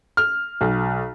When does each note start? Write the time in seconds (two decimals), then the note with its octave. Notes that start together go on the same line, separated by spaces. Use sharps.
0.17 F6
0.61 B1